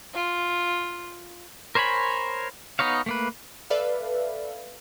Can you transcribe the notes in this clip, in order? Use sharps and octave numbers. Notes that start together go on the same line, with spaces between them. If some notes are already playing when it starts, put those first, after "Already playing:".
F4
A#4 C5 C#5 G#5 B5
B3 D#4 C#5 F5
A3 A#3 B4
A4 B4 D5 E5 F5